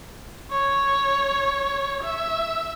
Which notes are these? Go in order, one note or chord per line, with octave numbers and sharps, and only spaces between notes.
C#5
E5